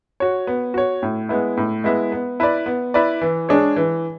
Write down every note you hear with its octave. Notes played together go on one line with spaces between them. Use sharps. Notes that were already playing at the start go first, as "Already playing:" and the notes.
F#4 C#5
B3
F#4 C#5
A2
G#3 B3 E4
A2
G#3 B3 E4
B3
E4 B4 D5
B3
E4 B4 D5
E3
G#3 D4 G#4 C#5
E3